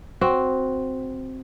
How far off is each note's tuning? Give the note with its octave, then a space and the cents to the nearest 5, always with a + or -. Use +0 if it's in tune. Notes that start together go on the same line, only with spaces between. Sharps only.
C4 +0 F#4 +0